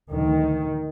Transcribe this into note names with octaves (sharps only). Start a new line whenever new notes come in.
D2 D#3